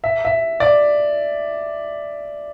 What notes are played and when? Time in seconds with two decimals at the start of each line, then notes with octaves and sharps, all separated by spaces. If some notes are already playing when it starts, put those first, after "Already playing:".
0.04 E5
0.25 E5
0.60 D5